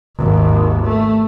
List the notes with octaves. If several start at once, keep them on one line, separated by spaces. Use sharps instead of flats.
G#1 D#2
A3